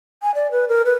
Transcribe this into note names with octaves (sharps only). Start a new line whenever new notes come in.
G#5
D5
B4
A#4
B4